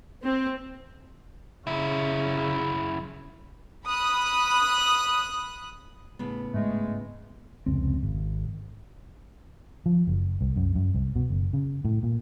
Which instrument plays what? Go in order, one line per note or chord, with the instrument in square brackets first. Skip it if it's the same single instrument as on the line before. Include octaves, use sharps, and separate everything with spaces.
[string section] C4
[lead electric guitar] F#2 E4 [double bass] C#3
[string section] B5 D#6 F#6
[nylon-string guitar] A2 C#3 B3
[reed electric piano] G#2 [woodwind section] G#3 A3
[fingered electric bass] F1 C#2 C#3 C4
G#1
F3
F#1
C2
F#2
F#2
C2
B2
F#1
C#3
A2
A#2